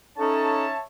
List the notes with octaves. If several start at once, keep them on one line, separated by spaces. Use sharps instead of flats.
C#4 D#4 A4 C#5 E5 A5